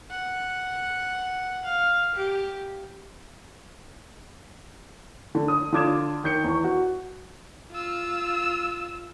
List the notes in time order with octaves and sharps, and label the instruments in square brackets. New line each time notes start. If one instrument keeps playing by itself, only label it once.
[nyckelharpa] F#5
F5
G4
[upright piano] D3
D#6
D3 F4 D6 G#6 E7
D#3 G6 C#7
E2 C#6
F#4
[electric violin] F4 E6